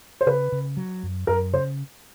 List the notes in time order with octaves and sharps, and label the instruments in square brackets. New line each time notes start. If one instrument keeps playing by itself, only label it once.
[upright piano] C5
[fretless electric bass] C#3 [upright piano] B4
[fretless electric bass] C#3
F#3
F#2
[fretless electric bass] F#2 [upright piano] A#4
[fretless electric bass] C#3 [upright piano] C5